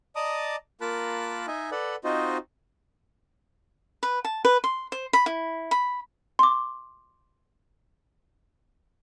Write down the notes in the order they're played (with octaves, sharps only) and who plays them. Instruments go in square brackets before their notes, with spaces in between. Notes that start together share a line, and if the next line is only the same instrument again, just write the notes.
[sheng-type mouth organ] D5 D#5 A5 A#5 D6 D#6
A#3 F4 A#4 A5 B5 F#6
D#4 D#5 E5 G#5
A4 B4 D5 F#5
C4 D#4 F4 F#4 C5 D#5
[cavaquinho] B4
A5
B4
C6
C5
B5
E4
B5
[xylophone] C6 D6